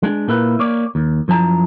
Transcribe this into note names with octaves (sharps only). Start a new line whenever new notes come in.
G#3 D4
A#2 A#3 E4 B4
A#3 C#5 D5
D#2
F#2 F3 E4 A5 A#5